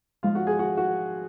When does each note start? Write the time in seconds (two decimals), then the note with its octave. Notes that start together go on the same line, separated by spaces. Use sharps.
0.23 G#2 F3 F4 F5
0.35 F#4 F#5
0.47 G#4 G#5
0.59 F#4 F#5
0.77 F#4 F#5